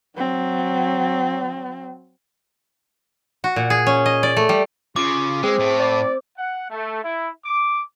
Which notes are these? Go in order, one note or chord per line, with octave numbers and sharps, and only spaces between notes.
F#3 C4
F#4
A#2
G#4
C#4
D#5
D5
A3
G3
C#3 F4 D6
G#3 C4 G#4
A2
D5
F#5
A3
E4
D6